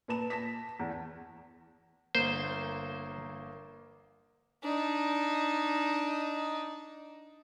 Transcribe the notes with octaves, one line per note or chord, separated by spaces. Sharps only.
A#2 B4 A5 E7
A5 A#6 B6
E2
G1 A#3 C5
D4 D#4